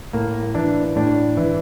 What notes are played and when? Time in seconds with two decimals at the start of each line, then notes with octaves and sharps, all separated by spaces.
0.13 A2 A#3
0.55 E3 D4
0.96 A2 D4
1.37 E3